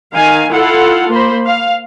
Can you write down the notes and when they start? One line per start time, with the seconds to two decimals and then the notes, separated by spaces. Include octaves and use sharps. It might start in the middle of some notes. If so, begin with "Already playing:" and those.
0.14 D#3 F5 G#5
0.52 E4 F4 A4 F5 F#5
1.10 A#3 C5 B5
1.45 F5